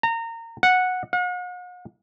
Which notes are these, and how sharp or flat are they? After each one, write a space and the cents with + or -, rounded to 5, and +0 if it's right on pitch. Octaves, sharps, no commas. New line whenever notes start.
A#5 -25
F#5 -10
F#5 -45